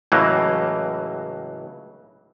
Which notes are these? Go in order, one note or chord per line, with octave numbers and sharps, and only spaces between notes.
C#2 A2 C#3 E3 F#3 A#3